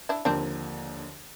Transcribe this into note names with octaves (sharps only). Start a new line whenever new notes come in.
D4 E4
D#2 D3 F3 A#3 C4 D4